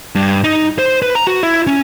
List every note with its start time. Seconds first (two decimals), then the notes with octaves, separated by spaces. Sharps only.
0.15 G2
0.44 D#4
0.78 C5
1.02 B4
1.15 A#5
1.27 F#4
1.43 E4
1.67 C#4